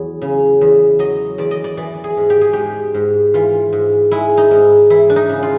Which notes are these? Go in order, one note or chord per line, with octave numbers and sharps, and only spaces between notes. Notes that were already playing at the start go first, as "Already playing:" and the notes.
Already playing: E2 F#3
C#3
E2
F#3 D#5
E2 D5
D#5
D5
E3 D5
G#4
G#2
G4
G#4
G#3 G4
G#2
E3 F4
G#2
G#3 E4
D#4
G#2
E3 E4
D4
D#4
C#3
F4